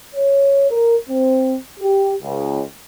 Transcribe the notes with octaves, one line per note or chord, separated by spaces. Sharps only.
C#5
A#4
C4
G4
C#2